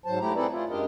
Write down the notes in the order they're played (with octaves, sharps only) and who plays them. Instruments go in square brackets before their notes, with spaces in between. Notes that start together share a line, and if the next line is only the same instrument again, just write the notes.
[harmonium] G#2 F#3 C5 A5
G#2 A3 E4 G4 A#5
C4 E4 G#4 A4 B4 D5
E4 F4
F#2 G#3 D4 G4 A#4 D#5